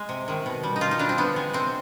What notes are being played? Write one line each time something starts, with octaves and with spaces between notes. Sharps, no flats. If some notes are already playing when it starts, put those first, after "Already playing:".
Already playing: G#3
C3
D#3 G#3
B2
G3
D#4
B2 F4
D#4
G3 D4
C4
D3 B3
G#3
C3 C4